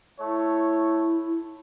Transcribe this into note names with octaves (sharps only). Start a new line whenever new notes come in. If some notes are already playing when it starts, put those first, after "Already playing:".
A3 E4 C#5